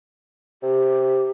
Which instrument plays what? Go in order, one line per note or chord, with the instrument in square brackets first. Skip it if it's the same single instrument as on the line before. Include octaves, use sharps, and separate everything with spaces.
[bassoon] C3 [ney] G4